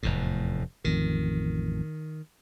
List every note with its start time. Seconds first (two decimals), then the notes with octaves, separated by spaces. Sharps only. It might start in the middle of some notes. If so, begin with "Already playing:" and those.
0.03 F1 E2 A2
0.84 A1 F2 D#3